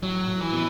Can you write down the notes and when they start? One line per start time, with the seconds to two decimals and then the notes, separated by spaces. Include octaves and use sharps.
0.02 A2 F#3
0.28 A2
0.40 E3
0.53 B3